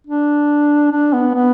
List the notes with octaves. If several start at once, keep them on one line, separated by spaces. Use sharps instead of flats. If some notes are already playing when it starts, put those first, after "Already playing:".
D4
D4
B3
B3